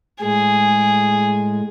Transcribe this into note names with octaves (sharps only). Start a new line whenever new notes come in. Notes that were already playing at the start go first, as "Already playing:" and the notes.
A2 G#3 G#4